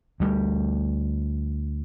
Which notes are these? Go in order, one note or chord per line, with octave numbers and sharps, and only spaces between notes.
D2 G3